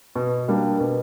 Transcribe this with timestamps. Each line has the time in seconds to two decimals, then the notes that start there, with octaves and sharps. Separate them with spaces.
0.16 B2
0.48 G3 A#3 D4
0.80 B2